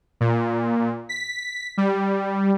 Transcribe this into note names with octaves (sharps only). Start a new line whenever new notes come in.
A#2
B6
G3